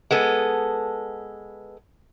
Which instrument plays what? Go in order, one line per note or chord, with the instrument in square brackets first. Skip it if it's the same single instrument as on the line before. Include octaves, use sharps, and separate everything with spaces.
[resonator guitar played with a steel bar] G#3 B3 A4